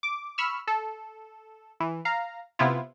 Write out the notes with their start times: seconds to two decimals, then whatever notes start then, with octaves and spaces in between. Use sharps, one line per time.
0.03 D6
0.38 B5 C#6 E6 F6
0.67 A4
1.80 E3
2.05 F5 A#5
2.59 C3 B3 E4 F4